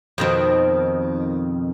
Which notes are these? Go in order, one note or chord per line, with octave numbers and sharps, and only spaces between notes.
F2 B2 D#3